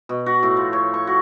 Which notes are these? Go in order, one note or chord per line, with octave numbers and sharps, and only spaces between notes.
B2
F#4
A2
F3
C#5
C#6
F#4